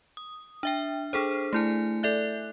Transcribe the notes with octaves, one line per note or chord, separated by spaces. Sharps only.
D#6
D4 E5 G5
D4 G#4 A4 C5
A3 E4 G#5
A4 D5 E5 F#6